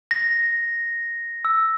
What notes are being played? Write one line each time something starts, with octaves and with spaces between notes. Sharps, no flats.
A#6
E6